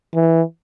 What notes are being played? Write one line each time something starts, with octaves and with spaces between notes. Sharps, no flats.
E3